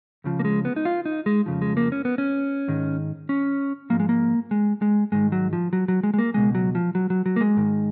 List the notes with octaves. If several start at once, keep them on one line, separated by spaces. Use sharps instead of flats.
C#2 C#3 F3
A#3
G#3
B3
D#4
F4
D#4
G#3
F2 C#3 F3
G#3
A#3
C#4
B3
C#4
G#2 D#3
C#4
G#2 F3 A#3
G#3
A#3
G#3
G#3
G#2 D#3 G#3
F#3
F3
F#3
F#3
G#3
G#3
A#3
C#2 B2 G#3
F#3
F3
F#3
F#3
F#3
A#3
G#3
G#2 D#3